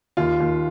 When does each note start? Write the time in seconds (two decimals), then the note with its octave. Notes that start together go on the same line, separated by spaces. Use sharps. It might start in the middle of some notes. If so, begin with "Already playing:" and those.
0.17 D#2 F4
0.40 D#2